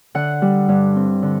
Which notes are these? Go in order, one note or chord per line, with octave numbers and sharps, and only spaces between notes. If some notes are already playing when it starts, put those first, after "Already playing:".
D3 F#5
G3
G2
C4
D3